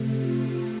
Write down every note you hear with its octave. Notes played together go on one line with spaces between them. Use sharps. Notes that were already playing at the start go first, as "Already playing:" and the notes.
Already playing: C3 A3
F4